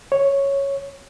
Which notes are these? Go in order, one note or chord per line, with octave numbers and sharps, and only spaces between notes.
C#5